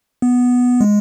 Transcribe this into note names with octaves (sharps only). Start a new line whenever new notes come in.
B3
G#3